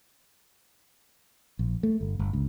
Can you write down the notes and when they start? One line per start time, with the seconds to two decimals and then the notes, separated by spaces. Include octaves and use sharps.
1.59 A#1
1.83 A3
2.01 G1
2.19 G1
2.33 C#2